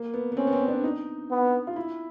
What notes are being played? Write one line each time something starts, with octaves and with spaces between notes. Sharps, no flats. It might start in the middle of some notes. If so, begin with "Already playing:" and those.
Already playing: A#3
B3
B3
C4 C#4
B3
C4
D4
D#4
B3
F4
E4